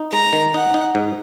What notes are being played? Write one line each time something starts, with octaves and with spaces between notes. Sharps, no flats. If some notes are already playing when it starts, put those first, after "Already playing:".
Already playing: D#4
G#3 A#5
D#3
D#4 F#5
D#4
G#2